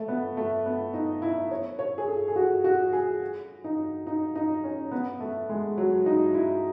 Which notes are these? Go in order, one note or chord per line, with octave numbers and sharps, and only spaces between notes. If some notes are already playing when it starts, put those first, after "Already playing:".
Already playing: A3
B3
A3
B3
D#4
E4
C#5
C#5
G#4
A4
G#4
F#4
F#4
G#4
D#4
D#4
D#4
C#4
B3
A3
G#3
F#3
D#4
E4